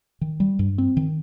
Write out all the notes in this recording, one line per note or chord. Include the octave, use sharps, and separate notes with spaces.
D#3
G3
G2
C4
D#3